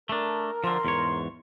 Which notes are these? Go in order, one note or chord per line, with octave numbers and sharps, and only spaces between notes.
A3 D4 A#4
D3 F3 C6
E2 G#2 C#5